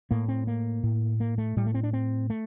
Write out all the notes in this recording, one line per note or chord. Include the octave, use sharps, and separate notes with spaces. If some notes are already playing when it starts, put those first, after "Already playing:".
A2 A#3
C4
A#3
A2
A#3
A3
A2 G3
A3
C4
D4
C4
A3